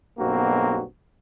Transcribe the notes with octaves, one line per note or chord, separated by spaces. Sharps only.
B1 G2 B2 A#3 C4 F#4